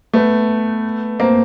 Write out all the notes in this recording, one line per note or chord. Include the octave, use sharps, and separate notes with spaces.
A3 B3
A#3 C4